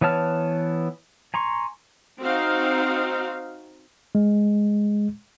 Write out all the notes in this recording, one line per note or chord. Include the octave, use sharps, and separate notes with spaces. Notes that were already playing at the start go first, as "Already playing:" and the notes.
E3 B3 C#5 A5 F6
G#5 A#5 C6 C#6
C4 D#4 F#4 F5
G#3